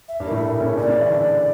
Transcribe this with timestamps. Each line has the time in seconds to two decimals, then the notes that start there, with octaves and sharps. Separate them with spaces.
0.08 E5
0.20 G2 G3
0.26 A#3
0.31 A2 A3
0.43 A#2 A#3
0.60 C#3 C#4
0.77 A#2 A#3 D5
0.88 C#3 C#4
1.00 E3 E4
1.11 D3 D4